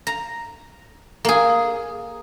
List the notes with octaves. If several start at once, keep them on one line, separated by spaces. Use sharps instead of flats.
A#5
A#3 G#4